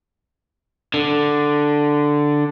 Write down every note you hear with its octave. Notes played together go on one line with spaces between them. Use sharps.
D3